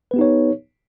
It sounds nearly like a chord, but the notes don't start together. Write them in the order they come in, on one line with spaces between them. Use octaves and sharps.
B4 B3 G4 D#4 C#5